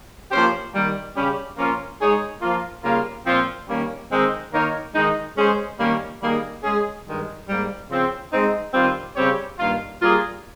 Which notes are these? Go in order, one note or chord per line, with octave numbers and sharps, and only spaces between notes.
F3 A#3 C#4 G4 C5
D#3 G3 A#3
C#3 G3 C#4 G4
F3 A#3 C#4 F4
G#3 D#4 G#4 C#5
F3 A#3 F4
C#3 G3 A#3 F4 A#4
A#2 F3 C4 F4 C5
D#3 G3 A#3 C#4
D#3 G#3 C4 D#4
D#3 A#3 D#4 A#4 C#5
D#3 G#3 D#4
G#3 C#4 G#4 C5
D#3 G3 A#3 C#4 G4
D#3 G3 A#3 D#4 G#4
G#3 C#4 G#4
G2 D#3 G#3
G#2 G3 A#3
C#3 F3 C4
G#3 C4 D#4
D#3 G3 C4 F4
C#3 G3 C4 G4 C#5
G2 D#3 A#3 F4
G3 A#3 F4 G#4